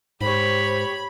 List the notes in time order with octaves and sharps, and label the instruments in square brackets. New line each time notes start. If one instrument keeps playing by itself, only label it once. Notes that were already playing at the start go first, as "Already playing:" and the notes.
[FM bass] G#2 [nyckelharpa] G4 C#5 [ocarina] C5 [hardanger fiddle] B5